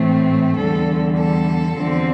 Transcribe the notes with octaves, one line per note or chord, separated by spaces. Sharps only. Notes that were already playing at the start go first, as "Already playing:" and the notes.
Already playing: A2 E3 A3 C4
E2 D3 G3 A4
A4
E2 D3 F3 C4